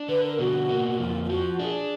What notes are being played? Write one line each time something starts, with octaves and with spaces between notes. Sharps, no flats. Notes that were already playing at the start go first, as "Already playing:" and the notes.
Already playing: D4
D3 B4
A#4
B2 F#4
A#3
F#4
F2 F4
F4
F3 F#4
D4 G#4